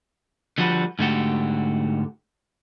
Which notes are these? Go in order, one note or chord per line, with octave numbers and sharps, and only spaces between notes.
D3 F3 G3 F#4 B4
G#2 D3 A3 F#4 G4